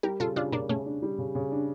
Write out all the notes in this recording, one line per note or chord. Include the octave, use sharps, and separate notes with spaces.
G3 G4 A#4
C#3 F4 A4
C#3 D4 F4
C#3 A#3 D4
C#3 A3 C#4
D4
G3
C#3
C#3
D4